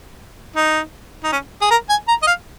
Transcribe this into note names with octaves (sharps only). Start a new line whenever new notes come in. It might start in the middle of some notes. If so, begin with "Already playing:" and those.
D#4
D#4
C#4
G#4
A#4
G#5
A#5
D#5
F5